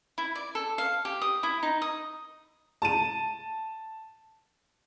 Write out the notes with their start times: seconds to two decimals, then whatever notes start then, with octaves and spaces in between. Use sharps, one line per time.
0.18 E4
0.36 D5
0.55 A4
0.78 F5
1.05 G4
1.22 D#6
1.43 E4
1.63 D#4
1.82 D#6
2.82 A5 D#7